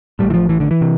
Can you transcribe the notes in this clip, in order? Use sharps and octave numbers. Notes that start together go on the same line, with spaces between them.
A1 A2 G3
E3
F3
E3
D3
E3
C3